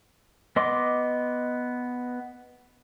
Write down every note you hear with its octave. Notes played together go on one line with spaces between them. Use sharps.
B3 D#5 C6 D6